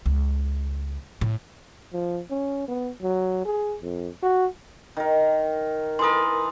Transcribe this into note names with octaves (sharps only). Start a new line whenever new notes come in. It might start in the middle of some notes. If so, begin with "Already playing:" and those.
C#2
A2
F3
C#4
B3
F#3
G#4
F2
F#4
D#3 A#4
E3 A4 A#4 C6 D#6